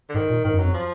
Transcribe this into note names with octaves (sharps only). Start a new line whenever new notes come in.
D3
G#2 D#3
A#2
G#2 D#3
F#2
F#3
F2
F3